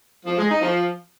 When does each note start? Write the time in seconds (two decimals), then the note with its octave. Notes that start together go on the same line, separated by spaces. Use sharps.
0.24 F3
0.36 G#3
0.48 D#4
0.60 F3